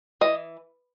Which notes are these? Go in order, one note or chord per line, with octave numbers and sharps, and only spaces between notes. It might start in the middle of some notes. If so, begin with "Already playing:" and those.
E3 D#5